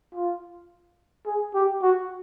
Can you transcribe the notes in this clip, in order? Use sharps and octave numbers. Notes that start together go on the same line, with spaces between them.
F4
G#4
G4
F#4